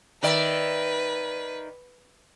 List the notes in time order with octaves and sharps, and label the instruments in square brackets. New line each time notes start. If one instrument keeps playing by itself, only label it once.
[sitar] D#3 D5 E5 [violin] B4